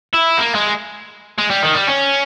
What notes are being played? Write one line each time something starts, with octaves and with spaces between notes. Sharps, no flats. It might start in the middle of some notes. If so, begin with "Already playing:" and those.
E4
A#3
G#3
G#3
G3
D#3
G3
C#4